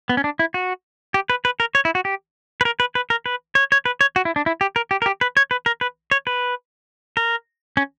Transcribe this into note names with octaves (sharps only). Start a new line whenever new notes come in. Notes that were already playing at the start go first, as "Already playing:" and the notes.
B3
C#4
D4
E4
F#4
G4
B4
B4
A#4
C#5
E4
F#4
G4
B4
A#4
B4
B4
A#4
B4
C#5
C#5
B4
C#5
F#4
E4
D4
E4
G4
A#4
G4
A#4
G4
B4
C#5
B4
A#4
B4
C#5
B4
A#4
C#4